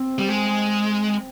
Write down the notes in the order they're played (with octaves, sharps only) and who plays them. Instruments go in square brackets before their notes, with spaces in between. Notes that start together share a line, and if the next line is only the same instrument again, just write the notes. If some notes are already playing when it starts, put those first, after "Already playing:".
Already playing: [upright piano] C4
[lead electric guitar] G3
G#3